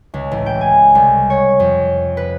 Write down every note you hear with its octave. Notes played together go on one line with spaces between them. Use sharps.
C#2
A1
G5
G#5
C2
C#5
F2
B4